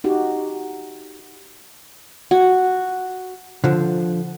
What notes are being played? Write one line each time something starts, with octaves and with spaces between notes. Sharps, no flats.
D#4 F#4 G4
F#4
D3 F3